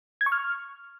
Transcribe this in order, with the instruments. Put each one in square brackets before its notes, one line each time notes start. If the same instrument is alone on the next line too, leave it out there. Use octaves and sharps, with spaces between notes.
[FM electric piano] G#6
C#6
F6